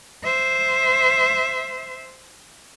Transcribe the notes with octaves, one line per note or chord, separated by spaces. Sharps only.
C5 E5